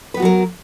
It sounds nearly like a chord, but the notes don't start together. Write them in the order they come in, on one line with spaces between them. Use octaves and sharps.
B4 B3 F#4 F#3 A#4